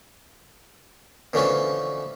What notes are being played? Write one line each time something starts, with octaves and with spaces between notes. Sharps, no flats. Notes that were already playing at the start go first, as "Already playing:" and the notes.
B2 D3 E3 F3 A3 C#4